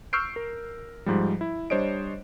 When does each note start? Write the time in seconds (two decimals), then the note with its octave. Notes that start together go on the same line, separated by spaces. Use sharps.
0.13 C#6 E6 F6 G6 C7 D7
0.36 A#4
1.06 G#2 F3 G3
1.41 E4
1.70 G3 D4 C5 C#5 D#5 D7